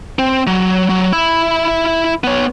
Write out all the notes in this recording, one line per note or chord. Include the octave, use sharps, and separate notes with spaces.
C4
F#3
F#3
E4 E5
B3 C#5